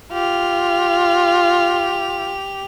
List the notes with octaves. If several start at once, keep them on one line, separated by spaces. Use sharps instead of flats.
F4 G4 F7